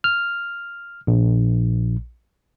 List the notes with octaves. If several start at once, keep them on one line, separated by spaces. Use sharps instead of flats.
F6
A#1